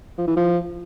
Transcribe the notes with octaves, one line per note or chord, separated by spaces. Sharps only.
F3
E3
F3